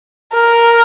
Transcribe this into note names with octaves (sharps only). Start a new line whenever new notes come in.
A#4